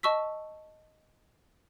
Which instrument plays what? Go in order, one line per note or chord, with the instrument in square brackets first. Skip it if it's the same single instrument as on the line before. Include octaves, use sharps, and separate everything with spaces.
[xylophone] D#5 A5 C#6 E6 B6